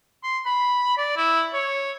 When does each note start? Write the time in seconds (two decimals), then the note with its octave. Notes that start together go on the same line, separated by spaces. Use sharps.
0.23 C6
0.45 B5
0.97 D5
1.17 E4
1.53 C#5